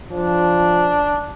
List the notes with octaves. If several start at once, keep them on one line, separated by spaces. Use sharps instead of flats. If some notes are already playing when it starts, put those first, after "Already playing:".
F3 D4